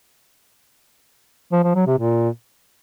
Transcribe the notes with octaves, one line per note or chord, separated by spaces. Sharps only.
F3
F3
F#3
C3
A#2